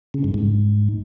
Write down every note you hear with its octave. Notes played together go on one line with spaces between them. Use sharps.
C#3
G2
G#2